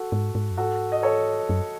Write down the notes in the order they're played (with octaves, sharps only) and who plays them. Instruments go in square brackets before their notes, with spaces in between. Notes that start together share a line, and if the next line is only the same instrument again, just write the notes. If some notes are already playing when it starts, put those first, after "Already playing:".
Already playing: [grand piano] F#4 A4
[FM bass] G#2
G#2
F#2
[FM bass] G#2 [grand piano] F#4 A4
[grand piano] D#5
A4 C#5
[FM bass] F#2